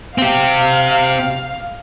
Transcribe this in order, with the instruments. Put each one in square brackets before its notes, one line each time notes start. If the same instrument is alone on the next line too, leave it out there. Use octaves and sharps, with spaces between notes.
[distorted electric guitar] C4 G4 [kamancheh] F5